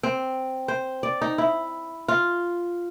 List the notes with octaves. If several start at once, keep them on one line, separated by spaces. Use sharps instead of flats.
C4
C5
D5
D#4
E4
F4